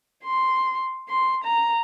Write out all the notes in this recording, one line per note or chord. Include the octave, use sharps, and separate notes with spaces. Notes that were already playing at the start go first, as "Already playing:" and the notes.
C6
C6
A#5